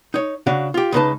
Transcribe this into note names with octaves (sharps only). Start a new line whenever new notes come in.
D#4 C#5
C#3 D4 F#4 F5
F4 G4
C#2 C#3 B3 D#4 B4 A5